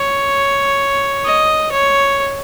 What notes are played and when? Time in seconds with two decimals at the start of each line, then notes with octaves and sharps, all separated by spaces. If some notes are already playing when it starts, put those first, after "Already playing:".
Already playing: C#5
1.25 D#5
1.72 C#5